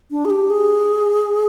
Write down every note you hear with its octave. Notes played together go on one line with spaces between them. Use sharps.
D4
G#4
G4
G#4